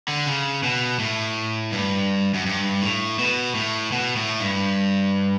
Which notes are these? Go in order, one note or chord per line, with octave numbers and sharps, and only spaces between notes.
D3
C#3
B2
A2
G2
F#2
G2
A2
B2
A2
B2
A2
G2